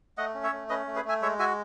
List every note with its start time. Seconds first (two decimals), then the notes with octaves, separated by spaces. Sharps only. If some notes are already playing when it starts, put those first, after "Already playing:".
0.18 A3 D#5 F#5
0.34 C#4
0.43 C#5 E5
0.53 A3
0.69 C#4 B4 D#5
0.87 A3
0.96 G#4 B4
1.05 A3 E5 G#5
1.22 G#3 C#5 E5
1.39 F#4 E5 G#5